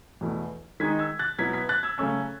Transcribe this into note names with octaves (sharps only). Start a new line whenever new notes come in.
E2 B2 A3 E4
D#3 G#3 D#4 G#6 B6
E6 G#6
F#6 A6
B2 F#3 B3 E4 G#6 B6
G#6 B6
F#6 A6
E6 G#6
C#3 F#3 A3 C#4 E6 G#6